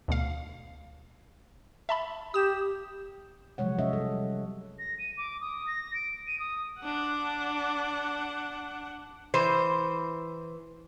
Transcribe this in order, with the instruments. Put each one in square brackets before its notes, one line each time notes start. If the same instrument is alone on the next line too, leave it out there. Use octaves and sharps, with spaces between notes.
[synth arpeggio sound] D2 B2 F5
E5 A5 B5
[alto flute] G4 [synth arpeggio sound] D#6 E7
[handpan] C3 F3 F#3 G#3 C#5 F#5
C#4 C#5 D#5 E5
G3 A4
[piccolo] A#6
D#7
D6
D#6
A#6
D7
D#7
D#6
[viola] D4 F#5
[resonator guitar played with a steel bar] E3 C5